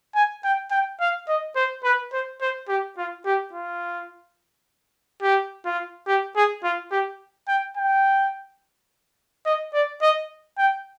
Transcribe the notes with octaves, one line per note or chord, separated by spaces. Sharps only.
G#5
G5
G5
F5
D#5
C5
B4
C5
C5
G4
F4
G4
F4
G4
F4
G4
G#4
F4
G4
G5
G5
D#5
D5
D#5
G5